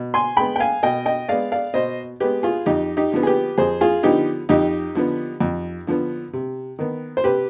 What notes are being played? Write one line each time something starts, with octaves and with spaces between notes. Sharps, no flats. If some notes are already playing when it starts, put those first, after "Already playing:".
Already playing: B2
G#5 C6
G#3 B3 G5 B5
G5
F5 G#5
B2 D#5 G5
D#5 G5
G#3 B3 D5 F5
D5 F5
B2 C5 D#5
G#3 B3 G4 B4
F4 G#4
F2 D#4 G4
D#4 G4
D3 F3 B3
G#4
G4 B4
F2 G#4 C5
F4 G#4
D3 F3 B3 D#4 G4
F2 D#4 G4
D3 F3 B3
F2
D3 F3 B3
C3
D#3 B3
C5
C3 G4 B4